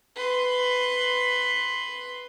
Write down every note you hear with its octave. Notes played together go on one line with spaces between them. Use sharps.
B4 C6